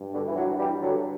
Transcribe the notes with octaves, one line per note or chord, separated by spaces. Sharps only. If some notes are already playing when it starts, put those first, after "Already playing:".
Already playing: G2
B2 D3
E3
D3 F#3
E3 G3
D3 F#3